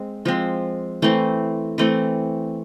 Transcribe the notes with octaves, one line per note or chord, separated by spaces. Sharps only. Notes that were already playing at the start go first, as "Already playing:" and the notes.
Already playing: G#3 C4
F3 G#3 C4
E3 A3 C4
E3 A3 C4